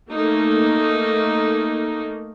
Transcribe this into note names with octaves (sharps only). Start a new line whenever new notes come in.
A3 A#3 D#4